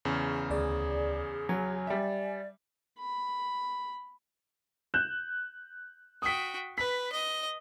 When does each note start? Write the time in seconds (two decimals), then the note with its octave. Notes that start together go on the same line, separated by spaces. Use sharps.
0.05 E2 C#3
0.50 D2 G#4 D5
1.49 F#3 G#5
1.87 G3 D5 E5
2.99 B5
4.94 F#6 G6 E7
6.22 F#4 G5 D#6 B6
6.78 B4 B6
7.12 D#5